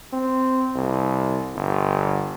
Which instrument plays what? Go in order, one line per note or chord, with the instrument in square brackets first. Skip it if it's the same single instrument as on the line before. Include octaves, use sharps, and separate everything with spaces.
[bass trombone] C4
C2
G1